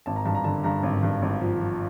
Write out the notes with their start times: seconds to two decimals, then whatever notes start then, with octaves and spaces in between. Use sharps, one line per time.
0.06 G#1 A5
0.16 A#5
0.25 G2 A5
0.35 A#5
0.44 D3 A5
0.64 G2 A#5
0.83 G#1
1.03 G2
1.22 G#1
1.41 F3
1.60 F3